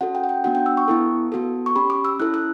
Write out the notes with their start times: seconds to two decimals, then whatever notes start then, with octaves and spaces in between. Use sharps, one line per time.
0.01 C#4 F#4 A4 F#5
0.15 G5
0.24 F#5
0.29 G5
0.44 B3 D4 F#4 F#5
0.55 G5
0.66 E6
0.77 C#6
0.88 B3 E4 A4
1.32 B3 F#4 A4
1.66 C#6
1.76 C#4 G4 B5
1.90 D6
2.05 E6
2.19 C#4 E4 A4 F#6
2.34 F#6